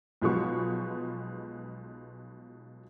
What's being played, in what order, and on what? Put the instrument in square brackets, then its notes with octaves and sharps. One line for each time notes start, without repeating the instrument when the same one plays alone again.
[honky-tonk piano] B1 B2 F3 G#3 B3 C#6